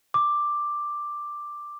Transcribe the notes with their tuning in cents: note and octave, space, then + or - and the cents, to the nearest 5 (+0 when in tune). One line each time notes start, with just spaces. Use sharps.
D6 +5